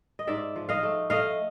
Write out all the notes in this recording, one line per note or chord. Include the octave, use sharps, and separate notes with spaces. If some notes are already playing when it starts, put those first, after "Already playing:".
D#5
G#2 D5 E5
F3
D#5 F5
A3
A3 D#5 F5